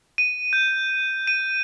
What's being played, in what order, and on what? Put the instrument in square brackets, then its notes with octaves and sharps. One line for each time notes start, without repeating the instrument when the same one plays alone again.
[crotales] D#7
G6
D#7